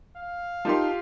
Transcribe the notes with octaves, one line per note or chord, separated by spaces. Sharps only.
F5
D#4 F4 G4 A#4 A5 C6